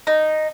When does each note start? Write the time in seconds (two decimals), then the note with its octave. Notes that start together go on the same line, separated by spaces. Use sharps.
0.07 D#4